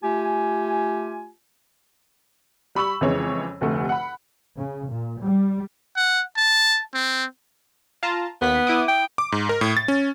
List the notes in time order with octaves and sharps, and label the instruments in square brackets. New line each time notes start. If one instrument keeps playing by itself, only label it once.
[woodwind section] A3 F4 G4 G#5
[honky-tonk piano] G3 B5 C#6 E6 F#7
F2 C#3 E3 G#3 C#5
F1 D2 C3 A3
F#5 B5
[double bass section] C#3
A#2
G3
[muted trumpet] F#5
A5
C4
[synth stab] F4 A5 A#5
[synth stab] D#2 B6 [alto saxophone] B3
[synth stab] E4 D6 D#6
[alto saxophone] G5
[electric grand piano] D6
G#2
A#4
A2
A6
C#4